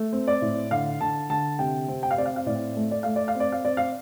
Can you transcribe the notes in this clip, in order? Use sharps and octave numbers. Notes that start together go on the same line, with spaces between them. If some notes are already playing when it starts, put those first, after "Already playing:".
Already playing: A3
C4
D5
A2
D3 F5
D3 A5
D3 A5
C3 G5
C4
G5
F5
C4 D5
F5
F5
A2 D5
A3
D5
A3 F5
D5
F5
C4
D5
F5
C4 D5
F5